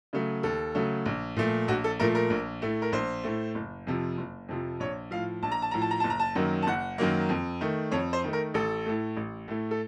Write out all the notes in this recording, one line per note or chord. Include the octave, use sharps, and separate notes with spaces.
C#3 F#3 A3
D#2 A4
C#3 F#3 A3
A#1
A#2 F3 A3
A#1 F#4
A4
A#2 F3 A3 A#4
A#4
A#1
A2 A3
A#4
A#1 C5
A2 A3
F#1
F2 C3 F3
F#1
F2 C3 F3
A#1 C#5
A2 F3 F5
A#1 A5
A#5
A5
A2 F3 A#5
A5
A#5
F#1 A5
A#5
A5
F#2 D#3 F#3 A#3
A5
F#1 F#5
F#2 D#3 F#3 A#3
F2
D#3 A3
F2 C#5
C5
D#3 A3
A#4
A1 A4
A2 A3
A1
A2 A3
A4